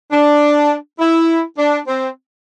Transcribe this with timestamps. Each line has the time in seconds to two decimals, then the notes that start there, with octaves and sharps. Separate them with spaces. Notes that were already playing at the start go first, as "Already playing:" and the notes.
0.11 D4
0.99 E4
1.58 D4
1.87 C4